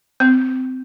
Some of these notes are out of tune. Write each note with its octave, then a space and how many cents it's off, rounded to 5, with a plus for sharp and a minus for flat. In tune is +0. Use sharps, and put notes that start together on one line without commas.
C4 -20